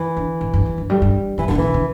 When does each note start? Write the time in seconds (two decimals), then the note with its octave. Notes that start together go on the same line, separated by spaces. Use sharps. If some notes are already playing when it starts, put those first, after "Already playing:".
Already playing: E3
0.17 D3
0.41 A2
0.54 G2
0.66 E2
0.78 G2
0.90 A2 G3
1.02 G2
1.38 A2 E3
1.48 A2 D3
1.58 B2 E3
1.74 D3